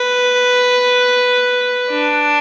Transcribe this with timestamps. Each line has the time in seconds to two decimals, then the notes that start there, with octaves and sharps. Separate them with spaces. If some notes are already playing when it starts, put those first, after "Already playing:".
Already playing: B4
1.90 D4